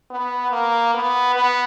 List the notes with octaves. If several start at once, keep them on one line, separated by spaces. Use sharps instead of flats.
B3
A#3
B3
B3